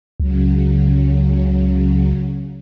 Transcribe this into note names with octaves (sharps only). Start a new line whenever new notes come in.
C#2 C#3 F#3